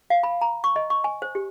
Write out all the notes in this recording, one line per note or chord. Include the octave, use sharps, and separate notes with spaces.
F5
B5
A#5
C#6
D#5
C#6
G#5
C5
G4